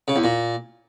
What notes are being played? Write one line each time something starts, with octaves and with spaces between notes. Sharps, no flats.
C#3
E2
A#2